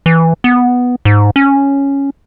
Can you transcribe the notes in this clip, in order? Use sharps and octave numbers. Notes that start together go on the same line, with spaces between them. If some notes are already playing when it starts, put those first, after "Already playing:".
E3
B3
G#2
C#4